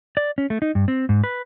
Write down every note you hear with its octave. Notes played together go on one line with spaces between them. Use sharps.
D5
C#4
A3
D#4
G2
C4
G#2
B4